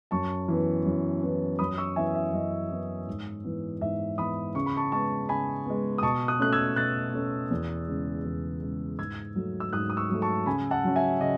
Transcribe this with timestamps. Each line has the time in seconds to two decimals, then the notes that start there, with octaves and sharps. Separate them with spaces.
0.11 F#2 A5 C#6
0.48 E3 B3
0.86 F#2
1.23 E3 B3
1.59 F#2 B5 D#6
1.77 C#6 E6
1.96 E3 B3 E5 G#5
2.15 E5
2.33 F#2 D#5
2.70 E3 B3
3.07 G#2
3.44 E3 B3
3.81 G#2 E5
4.18 E3 B3 B5 D#6
4.55 C#3 C#6
4.66 B5
4.77 A5 C#6
4.92 G#3 B3 A5 C#6
5.29 C#3 G#5 B5
5.66 G#3 B3
5.98 D#6
6.02 B2 A5 C#6
6.28 D#6 F#6
6.39 A3 C#4 F#6
6.53 E6 G#6
6.76 B2 F#6 A6
7.14 A3 C#4
7.51 E2
7.88 C#3 G#3
8.25 E2
8.62 C#3 G#3
8.99 G#2 E6 G#6
9.35 F#3 A3
9.60 E6
9.73 G#2 D#6 F#6
9.90 D#6
9.97 C#6 E6
10.10 F#3 A3
10.22 A5 C#6
10.46 C#3 G#5 B5
10.71 F#5 A5
10.84 F#3 C#4
10.96 E5 G#5
11.21 C#3 D#5